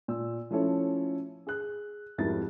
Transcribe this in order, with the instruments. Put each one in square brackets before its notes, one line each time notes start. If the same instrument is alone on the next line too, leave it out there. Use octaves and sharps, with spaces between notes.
[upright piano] A#2 E6
F3 A3 C#4 E4 A4 C#5
G#4 F#6
F2 G#2 G3 E4 A#4 A6